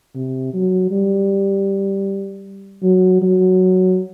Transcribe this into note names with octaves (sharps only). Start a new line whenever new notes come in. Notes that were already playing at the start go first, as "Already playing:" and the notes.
C3
F#3
G3
F#3
F#3